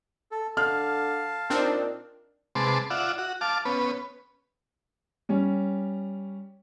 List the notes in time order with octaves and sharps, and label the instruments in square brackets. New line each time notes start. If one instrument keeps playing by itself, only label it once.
[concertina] A4
[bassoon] D3 [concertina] F5 A5 [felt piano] F6
[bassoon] A#2 [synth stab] C4 D4 D#4
[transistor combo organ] C3 G#3 B4 A5 C6 D6
F4 D5 E5 F#5
F#4
F5 A5 D6
B3 C#4 B4
[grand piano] G3 C#4